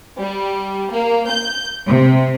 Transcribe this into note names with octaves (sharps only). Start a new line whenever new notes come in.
G3
A#3
G6
C3